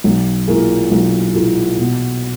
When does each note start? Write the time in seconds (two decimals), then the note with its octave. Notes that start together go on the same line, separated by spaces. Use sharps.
0.04 B1
0.47 A#2 A#3 E4 G#4
0.91 B1
1.35 A#2 A#3 E4 G#4
1.78 B2